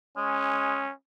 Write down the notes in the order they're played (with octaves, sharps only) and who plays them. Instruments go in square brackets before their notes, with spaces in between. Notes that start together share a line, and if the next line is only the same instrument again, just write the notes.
[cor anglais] G#3 [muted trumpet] C#4